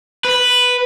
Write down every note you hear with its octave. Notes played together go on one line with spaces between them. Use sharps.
B4